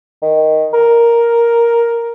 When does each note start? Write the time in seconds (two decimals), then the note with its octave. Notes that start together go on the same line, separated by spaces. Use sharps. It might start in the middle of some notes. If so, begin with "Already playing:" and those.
0.22 D#3
0.73 A#4